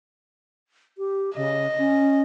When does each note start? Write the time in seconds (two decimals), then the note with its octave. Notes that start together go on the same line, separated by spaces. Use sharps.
0.98 G4
1.36 C#3 D#5
1.78 C#4